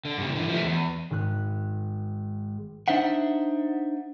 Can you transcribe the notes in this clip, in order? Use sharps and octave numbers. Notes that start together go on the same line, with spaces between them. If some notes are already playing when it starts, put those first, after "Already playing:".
D3
G2 C#3
D3 E3
F3 A3
E2
G#1 F#6
D4 D#4 C5 E5 F#5